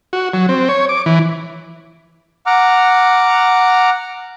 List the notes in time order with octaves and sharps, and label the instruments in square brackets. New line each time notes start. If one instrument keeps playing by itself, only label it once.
[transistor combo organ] F#4
F#3
C4
C#5
D6
E3
[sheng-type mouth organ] F#5 A#5 D6 F6